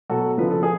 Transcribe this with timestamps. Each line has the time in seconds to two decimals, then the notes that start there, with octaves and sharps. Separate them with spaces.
0.09 B2 F#3 F#4 A4
0.38 C#3 F3 B4
0.50 A4
0.63 G#4